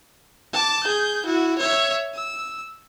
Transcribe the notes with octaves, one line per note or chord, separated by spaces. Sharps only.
A5 D6
G#4 G6
E4 F#4
C#5 E5
E6